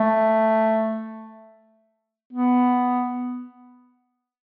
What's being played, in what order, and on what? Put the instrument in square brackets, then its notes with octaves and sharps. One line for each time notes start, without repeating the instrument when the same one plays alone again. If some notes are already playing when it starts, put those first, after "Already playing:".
Already playing: [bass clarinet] A3
B3